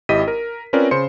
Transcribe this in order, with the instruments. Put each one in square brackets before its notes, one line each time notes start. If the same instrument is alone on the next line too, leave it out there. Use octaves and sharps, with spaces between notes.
[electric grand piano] G#1 E4 G4 D#5 B6 D#7
A#4
C4 C#4 F4 A#4 B4 D5
C#3 C5 C6 C#7